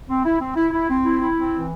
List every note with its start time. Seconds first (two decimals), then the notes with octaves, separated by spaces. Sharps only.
0.09 C4
0.25 E4
0.40 C4
0.56 E4
0.73 E4
0.89 C4
1.05 E4
1.21 E4
1.37 C4
1.53 E3